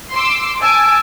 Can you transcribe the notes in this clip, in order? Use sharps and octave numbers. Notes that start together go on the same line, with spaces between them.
C6 D6 E6
G#5 A5 E6 D7